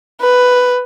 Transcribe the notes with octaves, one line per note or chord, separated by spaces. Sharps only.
B4